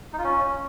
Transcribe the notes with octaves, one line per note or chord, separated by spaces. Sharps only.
D#4
F4
C#4